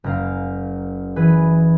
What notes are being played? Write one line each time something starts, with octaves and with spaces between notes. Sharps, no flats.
F#1 A#4 F5
E3 G#4 B4